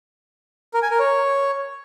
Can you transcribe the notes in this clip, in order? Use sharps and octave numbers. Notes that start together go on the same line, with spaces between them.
A#4
G#5
A#4
C#5